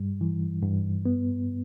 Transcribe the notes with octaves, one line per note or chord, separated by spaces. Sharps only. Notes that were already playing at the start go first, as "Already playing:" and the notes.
Already playing: G2 G3
E3
G2
B3